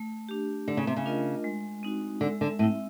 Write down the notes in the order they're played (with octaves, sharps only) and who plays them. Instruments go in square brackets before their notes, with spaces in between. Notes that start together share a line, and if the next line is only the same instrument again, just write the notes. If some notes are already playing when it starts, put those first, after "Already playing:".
Already playing: [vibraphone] A3
D4 G4
[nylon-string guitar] D3 [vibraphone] A3
[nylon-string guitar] C#3
C3
C#3
[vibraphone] D4 F4 A#4 D#5
G#3
C4 D#4 F#4
[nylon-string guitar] D3 [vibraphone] G#3
[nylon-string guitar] D3
[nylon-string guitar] A2 [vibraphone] C4 E4